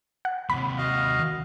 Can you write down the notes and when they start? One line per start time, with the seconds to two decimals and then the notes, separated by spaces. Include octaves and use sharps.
0.25 F#5
0.50 D#2 C3 B5
0.78 F#4 D#5 F5